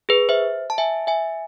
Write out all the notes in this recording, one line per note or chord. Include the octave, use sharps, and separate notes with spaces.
G#4 B4
C5 E5
A5
E5 G#5
E5 G#5